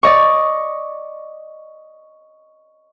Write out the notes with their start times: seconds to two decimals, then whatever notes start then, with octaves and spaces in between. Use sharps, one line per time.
0.03 D5 D#5 C#6